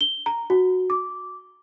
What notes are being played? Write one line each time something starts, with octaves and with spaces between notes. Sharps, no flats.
G7
A#5
F#4
D6